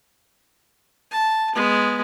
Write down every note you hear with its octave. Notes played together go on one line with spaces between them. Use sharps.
A5
G#3 B3